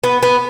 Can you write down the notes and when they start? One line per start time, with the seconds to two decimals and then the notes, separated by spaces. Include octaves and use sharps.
0.04 B3
0.23 B3